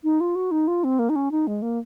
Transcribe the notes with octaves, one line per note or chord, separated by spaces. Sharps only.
D#4
F4
F#4
D#4
F4
C4
A#3
D#4
C#4
D#4
G#3
A#3